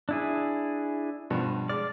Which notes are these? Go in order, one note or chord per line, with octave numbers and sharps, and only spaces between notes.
D4 E4 G#4
G2 B2 F3
G#3 D5 F6